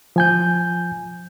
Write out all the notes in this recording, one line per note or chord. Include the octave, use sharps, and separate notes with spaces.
F3 G#5 G6